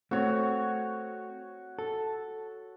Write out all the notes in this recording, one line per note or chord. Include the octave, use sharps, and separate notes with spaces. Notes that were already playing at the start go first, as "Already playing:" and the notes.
A3 C4 F#4 C#5
A4